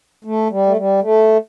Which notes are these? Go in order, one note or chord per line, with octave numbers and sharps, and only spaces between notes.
A3
G3
A3
G3
A3